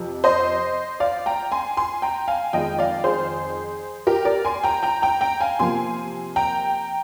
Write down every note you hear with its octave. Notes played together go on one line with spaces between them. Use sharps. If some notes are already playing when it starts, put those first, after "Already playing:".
Already playing: F2 C3 F3
C5 D#5
D5 F5
G5 A#5
G#5 C6
G#5 C6
G5 A#5
F5 G#5
F2 D#3 G#3 D#5 G5
D5 F5
G#4 C5
G4 A#4
A#4 D5
G#5 C6
G5 A#5
G5 A#5
G5 A#5
G5 A#5
F5 G#5
C3 F3 A#3 G#5 C6
G5 A#5